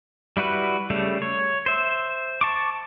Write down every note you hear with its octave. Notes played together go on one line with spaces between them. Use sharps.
G3 E4 F#4 B4
C#3 G3 A3
C#5
C5 E5
A5 C#6 D6